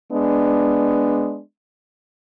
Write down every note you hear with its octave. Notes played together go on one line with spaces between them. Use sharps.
G#3 B3 D4